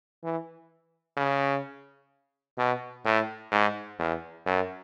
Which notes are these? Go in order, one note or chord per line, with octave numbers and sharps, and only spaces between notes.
E3
C#3
B2
A2
G#2
E2
F#2